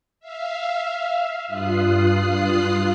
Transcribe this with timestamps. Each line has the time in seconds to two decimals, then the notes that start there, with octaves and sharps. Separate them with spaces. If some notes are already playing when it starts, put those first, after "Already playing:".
0.20 E5 F5
1.47 G2 F4 D#6 F#6 C7